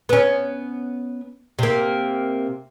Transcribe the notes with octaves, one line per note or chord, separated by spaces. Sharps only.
B3 C#4
C3 A#3